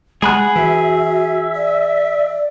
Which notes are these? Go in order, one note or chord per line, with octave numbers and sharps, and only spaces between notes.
G#3 G#4 F#5 B5 F#6
E3 F#4 E5
D5